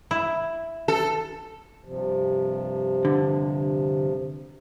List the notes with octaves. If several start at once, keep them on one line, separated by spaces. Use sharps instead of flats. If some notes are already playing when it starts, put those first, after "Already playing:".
E4
A4
G2 C3 F3
D3